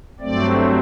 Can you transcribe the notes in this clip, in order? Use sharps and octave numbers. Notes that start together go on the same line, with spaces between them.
G2 F#3 A3 C4 D5